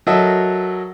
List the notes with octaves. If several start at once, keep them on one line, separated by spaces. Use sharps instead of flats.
F#3 F#4 A4 A#4 D#5 E5